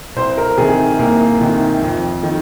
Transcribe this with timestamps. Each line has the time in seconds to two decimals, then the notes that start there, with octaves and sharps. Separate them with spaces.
0.16 C2 C5
0.38 A#4
0.57 C3 G#4
0.60 D#3
0.98 C2 A#3
1.40 C3 D#3
1.82 F2
2.23 D#3